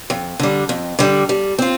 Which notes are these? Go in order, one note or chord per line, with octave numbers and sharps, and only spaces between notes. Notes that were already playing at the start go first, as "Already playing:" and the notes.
F2
D3 G3
F2
D3 G3
G3
C4 F4